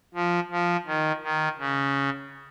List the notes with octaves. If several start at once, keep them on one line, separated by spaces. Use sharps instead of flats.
F3
F3
D#3
D#3
C#3